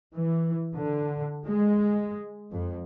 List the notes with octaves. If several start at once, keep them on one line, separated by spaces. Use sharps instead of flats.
E3
D3
G#3
F2